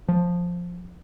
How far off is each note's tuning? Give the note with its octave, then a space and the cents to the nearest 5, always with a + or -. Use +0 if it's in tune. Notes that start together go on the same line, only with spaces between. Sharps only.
F3 +10